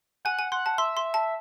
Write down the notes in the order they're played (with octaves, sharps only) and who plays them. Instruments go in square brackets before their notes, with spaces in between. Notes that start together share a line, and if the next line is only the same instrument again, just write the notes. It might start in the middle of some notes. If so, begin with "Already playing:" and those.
[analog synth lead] F#5 [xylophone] G#5
[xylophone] G#5
[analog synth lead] F#5 [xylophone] C6
[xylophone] A5
[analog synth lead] E5 [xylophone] C6
[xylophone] C6
A5